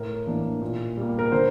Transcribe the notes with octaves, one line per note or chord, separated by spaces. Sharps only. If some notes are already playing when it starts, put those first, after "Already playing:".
Already playing: A2 A#4
E3 A#3 D4
A#2
G3 A#3
A#4
D3 C5